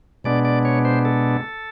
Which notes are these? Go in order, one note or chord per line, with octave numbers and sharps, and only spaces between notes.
B2 G#3 B3 D4 D5
D5
C#5
C5
A4